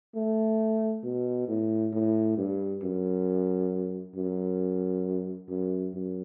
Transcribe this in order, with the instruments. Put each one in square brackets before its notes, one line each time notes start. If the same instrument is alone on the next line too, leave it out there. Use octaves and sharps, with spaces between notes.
[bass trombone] A3
B2
A2
A2
G2
F#2
F#2
F#2
F#2